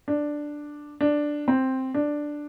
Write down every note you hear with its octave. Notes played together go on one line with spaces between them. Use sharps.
D4
D4
C4
D4